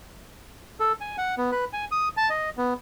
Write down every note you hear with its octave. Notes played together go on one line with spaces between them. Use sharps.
A4
G#5
F#5
B3
B4
G#5
D#6
A5
D#5
B3